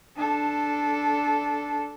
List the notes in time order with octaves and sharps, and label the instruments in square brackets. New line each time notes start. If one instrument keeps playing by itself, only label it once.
[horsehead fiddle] D4 A4